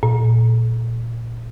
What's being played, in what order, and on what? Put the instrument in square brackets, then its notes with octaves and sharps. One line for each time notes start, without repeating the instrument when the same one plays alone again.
[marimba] A#2